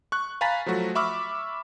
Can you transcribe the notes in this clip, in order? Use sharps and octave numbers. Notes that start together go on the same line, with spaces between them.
C#6 F#6
F5 G#5 A#5 B5 A6 B6
F3 F#3 A3 F#4
E5 B5 C#6 D6 E6 F6